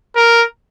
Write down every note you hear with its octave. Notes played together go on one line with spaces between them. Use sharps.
A#4